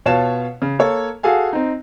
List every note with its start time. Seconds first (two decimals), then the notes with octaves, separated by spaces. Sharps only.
0.06 B2 F4 C#5 F5 A5 E7
0.62 C#3
0.79 A#3 A4 C#5
1.23 F#4 G#4 A4 F5 G#5
1.53 C4 D#4